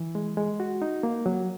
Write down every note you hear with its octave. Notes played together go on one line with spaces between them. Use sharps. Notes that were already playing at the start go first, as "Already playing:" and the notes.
Already playing: E3
G#3
G#3
F#4
D#4
A#3
F#3